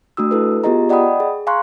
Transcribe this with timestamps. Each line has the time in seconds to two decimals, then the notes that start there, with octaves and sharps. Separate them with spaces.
0.17 A3 D4 F#4 D#6 E6
0.31 E4 A4 B4
0.64 B3 F4 G4 G#4 D#5 A#5
0.89 D5 D#5 F#5 G5 B5 D#6
1.20 G#4
1.47 F5 G#5 A#5 C6 C#6 F#6